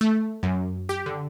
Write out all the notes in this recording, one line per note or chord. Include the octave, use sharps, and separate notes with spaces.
A3
F#2
G4
D3